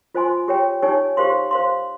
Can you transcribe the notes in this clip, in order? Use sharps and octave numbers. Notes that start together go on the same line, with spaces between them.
F4 C5 D#5 G#5 C6
G4 C#5 G5
D#4 G4 C#5 G#5
G4 C5 F5 C6
C5 F5 C6